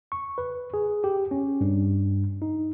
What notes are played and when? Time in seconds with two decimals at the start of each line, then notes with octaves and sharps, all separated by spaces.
0.12 C#6
0.38 B4
0.74 G#4
1.04 G4
1.31 C#4
1.61 G2
2.42 D#4